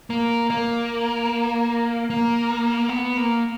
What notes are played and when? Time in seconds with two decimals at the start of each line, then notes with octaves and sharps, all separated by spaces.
0.10 A#3
0.50 A#3
2.10 A#3
2.89 B3
3.17 A#3